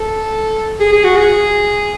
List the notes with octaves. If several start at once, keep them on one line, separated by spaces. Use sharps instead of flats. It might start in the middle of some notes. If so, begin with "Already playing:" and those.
Already playing: A4
G#4
G#4
F#4
G#4